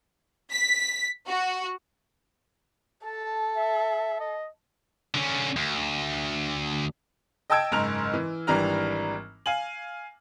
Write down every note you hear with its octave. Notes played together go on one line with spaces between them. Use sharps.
B6
F#4
A4 A5
E5
D#5
D3 C#4
D2
D#5 G5 A5 E6 G#6 D7
F#1 G#2 A#5 F6 F7
E3
G#1 E3 G3 D4 A#5 F6
F5 G#5 F#7